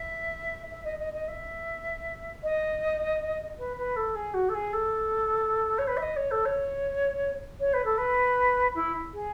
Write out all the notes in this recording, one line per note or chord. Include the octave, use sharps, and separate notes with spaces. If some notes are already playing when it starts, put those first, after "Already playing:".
Already playing: E5
E5
D#5
D#5
D#5
E5
D#5
B4
B4
A4
G#4
F#4
A4
G#4
A4
C#5
B4
E5
D#5
C#5
A4
C#5
C#5
B4
A4
B4
E4
G#4